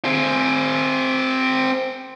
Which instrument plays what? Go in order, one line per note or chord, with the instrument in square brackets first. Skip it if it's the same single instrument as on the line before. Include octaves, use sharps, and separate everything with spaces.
[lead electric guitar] C4 G#4